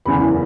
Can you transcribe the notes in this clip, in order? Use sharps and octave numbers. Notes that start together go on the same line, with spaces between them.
F#1 E2 C#3 E3 B5